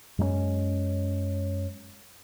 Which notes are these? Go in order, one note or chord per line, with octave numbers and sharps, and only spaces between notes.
F#2 G#3 A#3 C#4